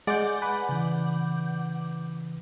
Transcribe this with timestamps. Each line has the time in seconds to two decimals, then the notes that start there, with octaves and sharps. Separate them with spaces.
0.07 G#3 D5 F#5 D6 G6
0.42 B4 G#5
0.69 C#3 E3